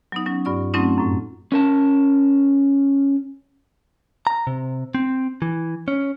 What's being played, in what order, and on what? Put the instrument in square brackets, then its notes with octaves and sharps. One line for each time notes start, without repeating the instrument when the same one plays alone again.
[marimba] F#3 B3 D#4
F#3 C#4
G2 F4 D5 C#6
F#3 A3 C4 C#4 D#4 F4
F#2 A2
[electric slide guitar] C#4 A#4 A5
[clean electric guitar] A#5
C3
C4
E3
C#4